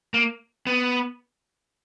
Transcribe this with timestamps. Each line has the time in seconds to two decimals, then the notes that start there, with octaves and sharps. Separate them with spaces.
0.14 A#3
0.67 B3